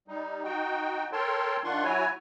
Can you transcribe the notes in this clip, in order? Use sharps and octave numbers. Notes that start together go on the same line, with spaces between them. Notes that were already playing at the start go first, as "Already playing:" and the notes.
G3 D#4
D#4 F#4 G5
A4 A#4 C#5 G5 A5 C6
D#3 D4 F4 F#5 C6 C#6
F#3 E4 F#4 C#5 G#5